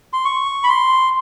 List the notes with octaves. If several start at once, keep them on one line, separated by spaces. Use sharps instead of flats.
C6
C#6
B5
C6